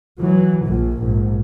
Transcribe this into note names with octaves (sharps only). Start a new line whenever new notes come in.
E3 F#3
A#1 A#2
A#1 G#2